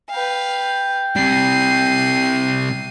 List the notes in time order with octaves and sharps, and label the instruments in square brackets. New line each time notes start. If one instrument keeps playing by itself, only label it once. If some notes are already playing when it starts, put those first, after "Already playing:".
[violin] B4 F5 [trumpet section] G5
[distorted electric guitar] C3 G3 [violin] C7 D#7